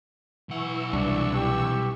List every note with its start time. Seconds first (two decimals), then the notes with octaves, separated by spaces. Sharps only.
0.49 B1 E3 F#5 C#6 E6
0.93 C2 D4
1.35 G4